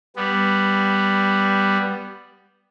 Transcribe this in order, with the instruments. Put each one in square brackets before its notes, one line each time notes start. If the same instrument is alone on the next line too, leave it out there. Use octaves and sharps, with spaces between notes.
[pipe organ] G3 B3